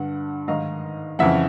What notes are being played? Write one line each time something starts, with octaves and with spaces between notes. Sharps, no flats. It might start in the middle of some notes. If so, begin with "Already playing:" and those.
Already playing: G2 D3 F#5
G#2 D#3 D#5 F5
F2 C#3 E3 E5 F#5